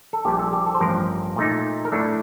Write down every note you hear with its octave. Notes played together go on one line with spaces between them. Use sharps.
A4
A#1 A#2 G3 G4
A4
G4
A4
C5
A1 G2 F3 A#4
A#2 A3 D#4
A#4
A2 A3 D4 A4